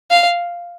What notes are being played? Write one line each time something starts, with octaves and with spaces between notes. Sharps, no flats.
F5